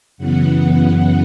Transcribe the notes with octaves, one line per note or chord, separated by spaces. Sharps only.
F#2 C#3 E3 B3 F#5
F#5